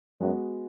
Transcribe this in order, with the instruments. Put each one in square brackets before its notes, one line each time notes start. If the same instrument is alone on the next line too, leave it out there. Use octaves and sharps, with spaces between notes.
[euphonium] F#2 [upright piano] G#3 B3 F#4